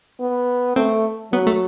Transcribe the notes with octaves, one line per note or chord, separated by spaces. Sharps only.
B3
A3 C4
F#3 B3
A3